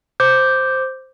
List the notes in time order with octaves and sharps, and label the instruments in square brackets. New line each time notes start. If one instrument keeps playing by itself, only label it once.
[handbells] C5 D6 G6